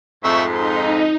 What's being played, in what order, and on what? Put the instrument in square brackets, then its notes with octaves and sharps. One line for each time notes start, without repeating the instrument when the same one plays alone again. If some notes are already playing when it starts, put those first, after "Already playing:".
[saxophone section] F2 G#2 [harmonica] A3 E5 C#6
[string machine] D#4 [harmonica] C6